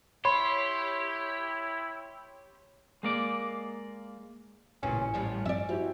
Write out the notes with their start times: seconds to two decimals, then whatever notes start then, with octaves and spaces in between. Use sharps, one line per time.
0.25 E4 G4 C#5 B5 C6
3.03 G#3 A#3 D5
4.83 A1 A#2 C#3 C#4
5.14 A2 F3 G3 C#4
5.46 G2 F3 C4 D5 E5
5.69 E4 F#4 G4 C5